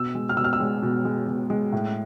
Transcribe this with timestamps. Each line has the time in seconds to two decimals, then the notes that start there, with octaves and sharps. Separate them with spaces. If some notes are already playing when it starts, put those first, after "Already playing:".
Already playing: B2 E6
0.15 G#3
0.29 F6
0.37 B2 E6
0.44 F6
0.53 E6
0.60 G#3
0.82 B2
1.05 G#3
1.27 B2
1.50 G#3
1.73 A2